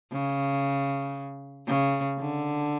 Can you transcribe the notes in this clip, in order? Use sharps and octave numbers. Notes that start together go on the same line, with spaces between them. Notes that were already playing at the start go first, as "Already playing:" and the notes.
C#3
C#3
D3